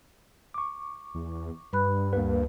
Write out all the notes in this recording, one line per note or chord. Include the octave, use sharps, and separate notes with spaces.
C#6 D6
E2
G2 B4 B5 F#6
D2 A#3 B4